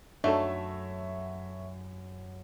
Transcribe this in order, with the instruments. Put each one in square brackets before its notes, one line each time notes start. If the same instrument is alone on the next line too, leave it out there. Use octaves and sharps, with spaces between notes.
[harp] F#2 [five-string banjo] A3 [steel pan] D4 D#4 A4 [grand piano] F#4 C#5 E5